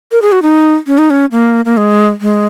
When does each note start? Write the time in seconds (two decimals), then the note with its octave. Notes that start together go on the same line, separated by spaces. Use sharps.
0.12 A#4
0.22 G#4
0.32 F#4
0.42 D#4
0.87 C#4
0.98 D#4
1.10 C#4
1.32 A#3
1.65 A#3
1.77 G#3
2.21 G#3